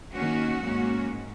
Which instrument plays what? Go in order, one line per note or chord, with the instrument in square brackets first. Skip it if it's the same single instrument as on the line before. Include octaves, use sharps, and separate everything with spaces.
[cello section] D#3 A#3 C#4 F#4
G#2 F#3 A#3 C#4
G#2